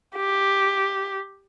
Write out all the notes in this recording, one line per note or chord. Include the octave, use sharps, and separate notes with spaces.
G4